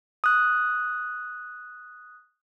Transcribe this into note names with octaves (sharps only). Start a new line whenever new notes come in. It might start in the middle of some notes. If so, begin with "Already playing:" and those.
D#6 F#6